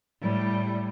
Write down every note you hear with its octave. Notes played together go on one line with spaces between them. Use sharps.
A2 G3